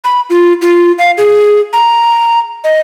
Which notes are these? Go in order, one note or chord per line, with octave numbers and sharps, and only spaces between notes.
B5
F4
F4
F5
G#4
A#5
D#5